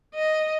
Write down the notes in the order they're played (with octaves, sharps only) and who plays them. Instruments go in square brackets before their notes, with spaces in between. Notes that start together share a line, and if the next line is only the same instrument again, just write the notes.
[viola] D#5